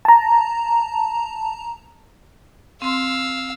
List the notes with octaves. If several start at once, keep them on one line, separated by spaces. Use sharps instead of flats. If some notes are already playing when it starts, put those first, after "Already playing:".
A5 A#5
C4 F5 C6 E6